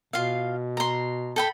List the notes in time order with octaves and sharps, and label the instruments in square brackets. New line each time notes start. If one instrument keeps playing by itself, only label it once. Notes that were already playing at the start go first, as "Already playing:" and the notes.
[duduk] B2 [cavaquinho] F4 F5
[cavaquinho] A#5 C6
A4 G5 B5